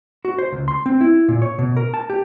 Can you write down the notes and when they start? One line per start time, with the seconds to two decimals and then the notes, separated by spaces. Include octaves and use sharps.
0.25 F#4
0.38 C5
0.52 C#2
0.68 C6
0.86 C4
1.01 E4
1.28 A#2
1.42 C#5
1.59 B2
1.77 A#4
1.94 A5
2.10 G4